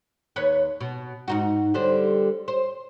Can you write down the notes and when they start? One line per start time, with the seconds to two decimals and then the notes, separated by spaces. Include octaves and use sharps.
0.36 D#2 B4 C#5
0.81 B2
1.28 G#2 D#4 F#4
1.74 D3 G3 C5
2.48 C5